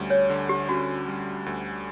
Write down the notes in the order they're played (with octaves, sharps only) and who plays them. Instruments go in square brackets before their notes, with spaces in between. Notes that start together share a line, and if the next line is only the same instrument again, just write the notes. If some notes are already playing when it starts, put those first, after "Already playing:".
Already playing: [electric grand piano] D2 G3 C#4
[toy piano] C#5
[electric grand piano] D3
[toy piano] G4
[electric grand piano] C#4 [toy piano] F#4
[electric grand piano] G3
D2